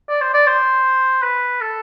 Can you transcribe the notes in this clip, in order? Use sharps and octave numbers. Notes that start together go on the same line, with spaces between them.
D5
C5
D5
C5
B4
A4